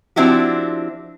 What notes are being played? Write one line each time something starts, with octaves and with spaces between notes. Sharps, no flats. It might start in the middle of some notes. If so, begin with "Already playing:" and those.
F3 C4 D4 E4 F#4 G4